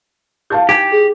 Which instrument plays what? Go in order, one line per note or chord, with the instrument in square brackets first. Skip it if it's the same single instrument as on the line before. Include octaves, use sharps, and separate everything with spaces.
[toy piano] E4 G4 D6 [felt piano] F5 A5 G6
[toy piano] D#4 G#5 [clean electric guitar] G4 [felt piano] G5 G#6
[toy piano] G#4